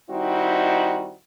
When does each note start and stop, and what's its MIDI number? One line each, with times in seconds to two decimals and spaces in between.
0.11 1.15 51
0.11 1.15 55
0.11 1.15 60
0.11 1.15 63
0.11 1.15 64
0.11 1.15 66